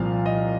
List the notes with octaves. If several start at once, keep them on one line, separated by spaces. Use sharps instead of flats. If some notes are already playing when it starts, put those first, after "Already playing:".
Already playing: C2 A#2 F3 F5
D#5